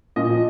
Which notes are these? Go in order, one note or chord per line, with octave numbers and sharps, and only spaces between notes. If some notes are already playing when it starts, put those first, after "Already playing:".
A#2 D#5
F3